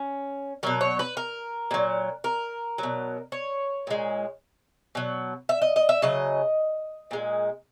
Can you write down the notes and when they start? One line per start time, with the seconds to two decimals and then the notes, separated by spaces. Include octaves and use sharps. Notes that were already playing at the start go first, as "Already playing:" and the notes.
Already playing: C#4
0.63 B2 F#3 A#4
0.81 C#5
0.99 B4
1.17 A#4
1.71 A#2 F#3
2.24 A#4
2.78 B2 F#3
3.32 C#5
3.87 A#2 G#3
4.95 B2 F#3
5.49 E5
5.62 D#5
5.76 D#5
5.89 E5
6.02 C#3 F#3 D#5
7.11 A#2 G#3